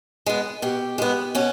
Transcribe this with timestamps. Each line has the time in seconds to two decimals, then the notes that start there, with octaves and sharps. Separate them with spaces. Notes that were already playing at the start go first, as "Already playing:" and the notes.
0.26 G#3 B3
0.62 B2 G4
0.98 G#3 B3
1.35 B2 C#4